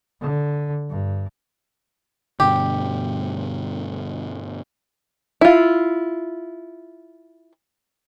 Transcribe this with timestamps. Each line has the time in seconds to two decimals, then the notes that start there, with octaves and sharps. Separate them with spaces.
0.21 D3
0.90 G2
2.40 G2 B2 D3 G4
5.41 E4 F4